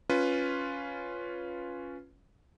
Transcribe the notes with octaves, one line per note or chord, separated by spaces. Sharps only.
C#4 F4 B4